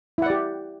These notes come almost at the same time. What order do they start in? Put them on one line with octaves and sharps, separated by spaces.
E4 F#5 D5 G4